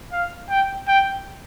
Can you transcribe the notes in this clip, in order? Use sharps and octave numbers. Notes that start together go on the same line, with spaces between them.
F5
G5
G5